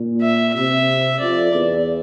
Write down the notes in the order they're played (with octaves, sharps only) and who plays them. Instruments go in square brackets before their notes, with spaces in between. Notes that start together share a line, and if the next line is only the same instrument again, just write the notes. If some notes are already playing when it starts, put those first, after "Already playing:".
Already playing: [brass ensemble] A#2
[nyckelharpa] E5
[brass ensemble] C3 [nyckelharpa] E5
[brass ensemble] F2 [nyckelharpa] D5
[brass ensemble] E2